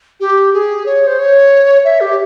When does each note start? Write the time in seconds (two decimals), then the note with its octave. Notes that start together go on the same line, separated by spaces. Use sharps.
0.20 G4
0.53 G#4
0.86 C#5
1.07 C5
1.19 C#5
1.85 E5
2.00 G4